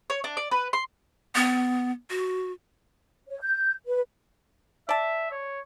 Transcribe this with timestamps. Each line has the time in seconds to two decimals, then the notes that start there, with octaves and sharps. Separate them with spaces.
0.10 C#5
0.24 D4
0.37 D5
0.51 B4
0.73 C6
1.35 B3
2.10 F#4
3.29 C#5
3.40 G6
3.87 B4
4.89 D5 E5 A5
5.31 C#5